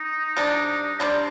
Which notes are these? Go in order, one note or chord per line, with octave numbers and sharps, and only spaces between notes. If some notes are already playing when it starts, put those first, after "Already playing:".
Already playing: D#4
C3 G3 D4
C3 G3 D4 C5